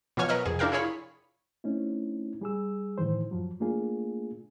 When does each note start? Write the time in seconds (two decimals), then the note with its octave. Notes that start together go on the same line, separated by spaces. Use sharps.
0.17 B2 F3 F#3 C#5 G#5 F6
0.29 A#4 B4 D#5 F#5 F6
0.45 F2 C3 G#4
0.59 D4 E4 A#4 F5 G5
0.72 E4 F4 G#4 C#5 B5
1.64 A3 C4 C#4 D#4 E4
2.41 G3 G#4 E6
2.98 A2 D#3 E3 C5
3.31 F#2 F3 F#3
3.61 A3 A#3 D4 F4 G#4